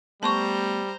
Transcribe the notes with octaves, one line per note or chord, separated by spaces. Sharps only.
G3 A3 B3 C5 A5 A#5 C6 C#6